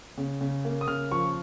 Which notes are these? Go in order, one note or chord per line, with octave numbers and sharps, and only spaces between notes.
C#3
C#3
A#3
D#6
C#3 F6
F3 C#6